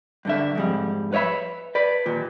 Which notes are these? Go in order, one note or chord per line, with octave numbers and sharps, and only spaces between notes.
G2 D3 E5
F2 G#2 G3
B4 C#5 D#5 E5 B5
B4 D5
D#2 A#2